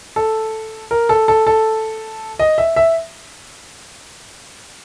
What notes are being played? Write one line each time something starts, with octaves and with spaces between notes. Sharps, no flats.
A4
A#4
A4
A4
A4
D#5
E5
E5